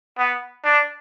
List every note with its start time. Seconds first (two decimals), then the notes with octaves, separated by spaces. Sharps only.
0.18 B3
0.64 D4